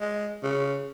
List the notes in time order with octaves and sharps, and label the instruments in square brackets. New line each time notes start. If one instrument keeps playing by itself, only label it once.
[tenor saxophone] G#3
C#3